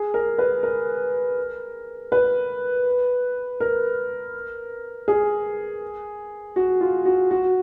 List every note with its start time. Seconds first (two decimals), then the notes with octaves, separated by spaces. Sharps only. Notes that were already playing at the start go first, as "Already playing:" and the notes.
Already playing: G#4
0.14 A#4
0.38 B4
0.63 A#4
2.12 B4
3.60 A#4
5.08 G#4
6.56 F#4
6.81 F4
7.06 F#4
7.31 F#4